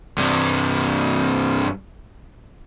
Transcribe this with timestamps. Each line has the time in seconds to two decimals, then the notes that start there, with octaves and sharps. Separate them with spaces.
0.18 G2 C3